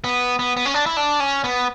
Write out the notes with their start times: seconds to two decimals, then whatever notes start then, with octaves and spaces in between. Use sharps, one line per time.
0.04 B3
0.39 B3
0.57 B3
0.65 C#4
0.74 D4
0.86 E4
0.97 D4
1.20 C#4
1.44 B3